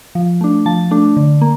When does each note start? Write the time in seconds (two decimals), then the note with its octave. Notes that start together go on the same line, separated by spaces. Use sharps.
0.15 F3
0.41 A3 D4
0.66 F3 A5
0.91 A3 D4
1.16 D3
1.41 A#3